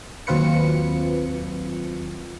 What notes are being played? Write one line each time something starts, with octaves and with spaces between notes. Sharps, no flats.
D#2 F#3 C4 F4 B4 C#7